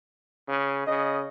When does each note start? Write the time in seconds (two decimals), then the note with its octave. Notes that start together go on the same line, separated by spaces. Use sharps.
0.48 C#3
0.87 C#3 D#5